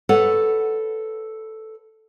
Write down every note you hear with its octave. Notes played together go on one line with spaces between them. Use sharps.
A4 B4 C#5 F#5